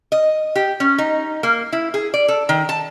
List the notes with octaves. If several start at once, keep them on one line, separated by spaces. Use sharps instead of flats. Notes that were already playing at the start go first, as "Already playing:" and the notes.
D#5
G4
C#4
D#4
A#3
E4
G#4
D5
A4
D#3
A5